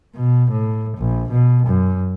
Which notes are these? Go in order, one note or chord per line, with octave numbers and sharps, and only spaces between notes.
B2
A2
A#1
B2
F#2